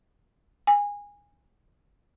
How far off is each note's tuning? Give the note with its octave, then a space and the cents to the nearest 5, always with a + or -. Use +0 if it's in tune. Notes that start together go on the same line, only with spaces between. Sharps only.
G#5 -20